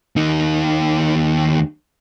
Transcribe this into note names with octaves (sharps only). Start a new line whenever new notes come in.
D#2 D#4